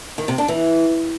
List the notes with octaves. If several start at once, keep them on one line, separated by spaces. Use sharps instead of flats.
D#3
C3
D4
E3